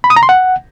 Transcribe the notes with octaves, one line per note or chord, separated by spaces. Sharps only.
B5
D#6
A#5
C6
F#5